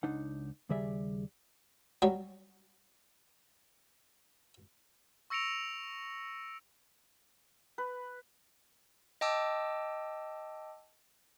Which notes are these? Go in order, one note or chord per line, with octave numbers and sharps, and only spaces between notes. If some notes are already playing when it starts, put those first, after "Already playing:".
C#2 D4 D#4 F#5
D#2 C#3 G3 G#4 D5 E5
F#3 G3
C#6 E6 A#6 C#7 D7 F7
B4
D#5 G5 A5 D6 E6